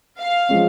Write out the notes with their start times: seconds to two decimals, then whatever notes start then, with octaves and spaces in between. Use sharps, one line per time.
0.19 F5
0.49 F3 G#3 C#4